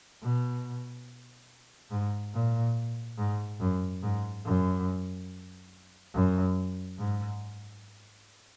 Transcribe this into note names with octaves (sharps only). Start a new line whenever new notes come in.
B2
G#2
A#2
G#2
F#2
G#2
F#2
F#2
G#2